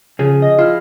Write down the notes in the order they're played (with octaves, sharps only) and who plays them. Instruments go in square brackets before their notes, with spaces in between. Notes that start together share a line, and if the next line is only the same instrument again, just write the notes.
[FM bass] C#3 [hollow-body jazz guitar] F3 G#4
[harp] D#5
[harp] E4 F6 [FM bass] F4